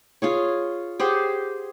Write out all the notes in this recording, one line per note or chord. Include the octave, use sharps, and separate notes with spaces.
F4 G#4 C#5
G4 G#4 C5 F#5